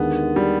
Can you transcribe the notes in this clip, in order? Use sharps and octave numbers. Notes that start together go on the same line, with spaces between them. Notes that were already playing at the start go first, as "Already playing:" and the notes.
Already playing: D#2 D3 G#3 B3
G3